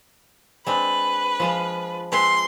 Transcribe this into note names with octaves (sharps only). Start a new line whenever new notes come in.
G#3 C4 D4 B4
F3 G#3 F4
G#3 C4 B4 C6